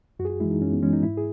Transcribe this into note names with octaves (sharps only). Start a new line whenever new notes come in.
F#2 F#4
G#4
F#4
E3 G#3 E4
D#4
F#2 C#4
B3
E3 G#3 C#4
D#4
G#2 E4
G#4